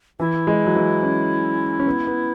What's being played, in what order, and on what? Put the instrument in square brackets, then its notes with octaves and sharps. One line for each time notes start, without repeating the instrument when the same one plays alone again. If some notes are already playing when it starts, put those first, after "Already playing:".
[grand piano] E3 [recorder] E4
[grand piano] G#3
F#3
E3
C#4
C#4
B3
B3